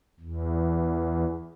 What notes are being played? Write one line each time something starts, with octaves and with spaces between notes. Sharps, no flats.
E2